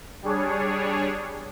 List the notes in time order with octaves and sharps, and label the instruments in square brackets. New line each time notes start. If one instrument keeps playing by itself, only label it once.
[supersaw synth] G3 D4 G#4 C#5